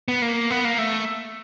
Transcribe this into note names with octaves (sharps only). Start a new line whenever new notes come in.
B3
A#3
B3
A#3
A3